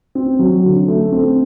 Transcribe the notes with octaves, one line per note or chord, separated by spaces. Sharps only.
C4
F#3
D3
A3
C4